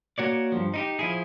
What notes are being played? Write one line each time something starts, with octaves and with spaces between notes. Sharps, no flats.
A#3 F#4 C#5 D5
G2 F3
D#4 E4 G4
F3 E4 G#4